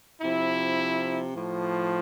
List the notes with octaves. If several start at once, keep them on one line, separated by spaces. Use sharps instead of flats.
C3 F3 E4
A2 F3